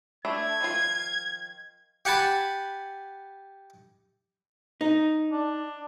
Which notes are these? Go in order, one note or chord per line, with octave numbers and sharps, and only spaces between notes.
A3 D4 E4 G#6
D#3 F3 F4
G4 F#5 G#5 A5 B5
D#4
D4